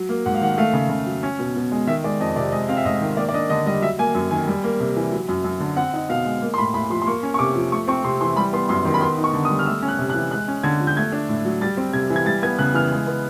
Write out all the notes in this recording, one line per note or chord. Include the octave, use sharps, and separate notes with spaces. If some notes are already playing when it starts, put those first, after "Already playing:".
Already playing: F#3
A#3
G#2 F#5
F5
D#3 F#5
A3 F5
C#3
C#3
F#3
C#4
B2
B2
G#3
D#3 E5
G#3 D5
F2 D#5
C3 D5
G#3 D#5
C4 F5
E5
G#2 D#5
D#3
A#3 D5
D5
D4 D#5
D3 D#5
G3 D#5
F#3 E5
A#3 G#5
F#2
D#3 G#5
G3
A#3
C3
E3
F#3
F#2
F#2
D3
C4 F#5
D#4
B2 F5
G#3
A#3
C6
A2 B5
A2 B5
F3 C6
C6
A#3 C#6
C#4
C#6
C3 D6
F3
A3 C#6
C4 C#6
C3 C6
E3 C6
G3 B5
B3 C6
F#2 C6
D#3 C6
B5
B3 C6
D#4
C#6
D3
D#6
G3
F6
A3 E6
C#4
F#6
C3
F#6
E3
G#3 F#6
C#4
D3 G#6
F3
G6
A3 G#6
D4
A2
F#3
G3 A6
C4
C3 G#6
E3
G#6
G3 A6
B3 G#6
C#3 F#6
E3 F6
G#3
B3